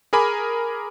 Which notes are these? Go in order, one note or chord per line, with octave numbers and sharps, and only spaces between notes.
G#4 A#4 G#5 B5 D6